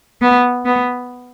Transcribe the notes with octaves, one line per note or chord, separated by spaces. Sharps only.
B3
B3